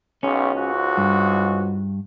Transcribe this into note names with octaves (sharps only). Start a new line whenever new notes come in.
B1 C#3 C#4
C#2 G#2 F#4
G2